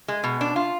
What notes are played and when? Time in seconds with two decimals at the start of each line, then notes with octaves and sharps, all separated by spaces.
0.08 G#3
0.24 B2
0.41 D4
0.56 F4